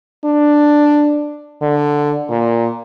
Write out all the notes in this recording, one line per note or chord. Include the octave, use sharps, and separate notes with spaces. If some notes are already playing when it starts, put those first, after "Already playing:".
D4
D3
A#2